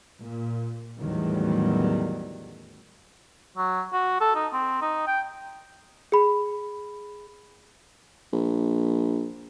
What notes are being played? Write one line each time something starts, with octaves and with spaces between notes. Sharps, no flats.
A#2
A1 E2 D#3 F#3 G3
F#3
F#4
A4
D#4
C4
D#4
G5
G#4 B5
A#1